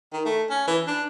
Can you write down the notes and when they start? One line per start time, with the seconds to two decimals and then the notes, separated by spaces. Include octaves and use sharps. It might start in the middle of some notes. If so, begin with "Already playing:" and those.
0.13 D#3
0.25 A3
0.50 C#4
0.67 E3
0.87 D4